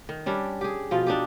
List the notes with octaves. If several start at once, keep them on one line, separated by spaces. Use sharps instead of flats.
D#3
G3 C#4 D4
G4 G#4
B2 F3 F4
D4 D#4 G4